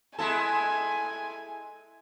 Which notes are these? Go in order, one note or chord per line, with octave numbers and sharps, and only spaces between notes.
G#3 E4 A4 G#5